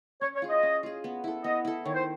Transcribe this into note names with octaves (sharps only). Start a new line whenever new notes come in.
C#4 C#5
C#5
F4 G#4
D#5
C#4
F4 G#4
B3
E4 A4
B3 D#5
E4 A4
D#3 C#5
C5